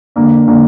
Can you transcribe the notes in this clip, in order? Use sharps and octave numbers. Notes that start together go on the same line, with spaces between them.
D3 A#3 D4
D3 A#3 D4